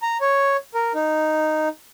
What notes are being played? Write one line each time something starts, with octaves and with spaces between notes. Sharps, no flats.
A#5
C#5
A#4
D#4